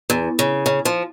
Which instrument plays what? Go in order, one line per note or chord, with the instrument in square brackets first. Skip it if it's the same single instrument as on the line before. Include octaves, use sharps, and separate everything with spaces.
[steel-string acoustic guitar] E2
C#3
C#3
F3